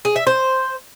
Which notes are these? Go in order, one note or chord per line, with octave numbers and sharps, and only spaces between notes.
G#4
E5
C5